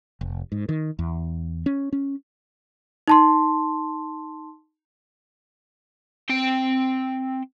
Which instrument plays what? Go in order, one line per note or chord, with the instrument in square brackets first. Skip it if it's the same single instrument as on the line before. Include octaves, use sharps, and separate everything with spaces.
[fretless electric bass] F1
G#2
D#3
E2
C#4
C#4
[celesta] D#4 A5 C6
[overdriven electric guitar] C4 G5